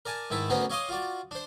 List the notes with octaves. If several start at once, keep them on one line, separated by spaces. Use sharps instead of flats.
A#4 D5 G#5 A5
G#2 D#3 E4 B4 A5
D2 B3 C#4 F#4 A#4 C5
C#5 D#5 F5 C6 D6 D#6
F4 F#4 D5
D4 C5